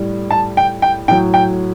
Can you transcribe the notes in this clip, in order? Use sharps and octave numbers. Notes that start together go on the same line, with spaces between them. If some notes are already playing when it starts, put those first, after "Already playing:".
Already playing: A2 G3
A5
G5
G5
A2 F#3 G5
G5